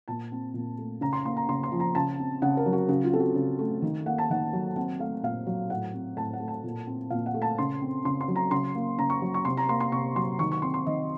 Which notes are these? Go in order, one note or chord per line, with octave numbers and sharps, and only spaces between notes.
A#2 A5
C4
A#2
A3
C#3 A#5
C6
A#3 C6
A#5
C#3 C6
C6
F3
A#5
C#3 A5
C4
C#3 F#5
A#4
F#3
F#4
C#3 F#4
F4
C4 A4
F#4
C#3
A3
D#3
A#3 F#5
A5
D#3 F#5
F#3
C4 F#5
A3 F5
A#2 F5
F#3
A2 F#5
C4
A2 A5
F#5
A3
A5
A#2
C4
A#2 F5
F#5
A3
A5
C#3 C6
C4
C#3 C6
C6
F#3
A#5
C#3 C6
A#3
C#3 A#5
C#6
F#3
C#6
C3 C6
A#5
A#3 C6
C6
C3 C#6
F#3 C6
D#3 C#6
C#6
C4 C6
C6
D#3 D#5